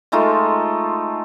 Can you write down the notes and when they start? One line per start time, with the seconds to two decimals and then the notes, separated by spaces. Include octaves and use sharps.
0.12 G#3 A3 D#4 F4